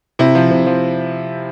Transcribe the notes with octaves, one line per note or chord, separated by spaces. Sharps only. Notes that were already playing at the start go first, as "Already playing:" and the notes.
C3 E4
F3
C3
F3